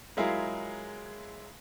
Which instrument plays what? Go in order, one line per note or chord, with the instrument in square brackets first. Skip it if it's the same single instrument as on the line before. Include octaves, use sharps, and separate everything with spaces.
[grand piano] F#3 G#3 E4 F4 G#4 A#4